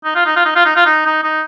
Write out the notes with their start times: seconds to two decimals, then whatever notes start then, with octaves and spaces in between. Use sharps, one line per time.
0.05 D#4
0.16 F4
0.26 D#4
0.36 F4
0.45 D#4
0.56 F4
0.66 D#4
0.76 F4
0.86 D#4
1.06 D#4
1.23 D#4